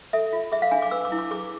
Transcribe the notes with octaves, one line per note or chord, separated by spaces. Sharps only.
A4 E5
F4
G#4 E5
F5
D4 G#5
D6
B4 E6
D6
E4
D6
G#4 D6